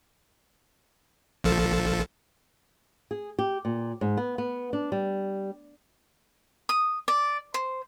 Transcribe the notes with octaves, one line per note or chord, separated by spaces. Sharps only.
A#1 F3 A4
G#4
G4
A#2
G#2
B3
B3
D4
G3
D#6
D5
C5